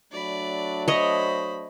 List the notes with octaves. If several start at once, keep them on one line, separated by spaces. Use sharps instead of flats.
F#3 A3 D4 D5 B5
C5 C#5 D#5 B5